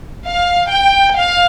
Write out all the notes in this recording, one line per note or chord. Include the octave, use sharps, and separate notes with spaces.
F5
G5
F5